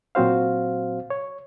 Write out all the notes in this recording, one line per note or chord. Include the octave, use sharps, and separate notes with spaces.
A#2 F#3 C4 F#4 C5 F5
C#5